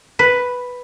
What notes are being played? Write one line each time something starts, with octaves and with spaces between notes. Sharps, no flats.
B4